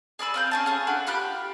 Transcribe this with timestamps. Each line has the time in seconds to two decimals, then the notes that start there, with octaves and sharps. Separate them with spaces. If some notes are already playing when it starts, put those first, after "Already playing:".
0.19 G#4 D5 B5 E6
0.34 C4 F5 G6
0.51 C#4 G#4 A5
0.66 F4 G#4 A4
0.87 D4 F#4 B5
1.07 F4 G4 B5 F#6